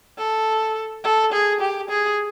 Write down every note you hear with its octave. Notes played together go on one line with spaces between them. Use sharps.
A4
A4
G#4
G4
G#4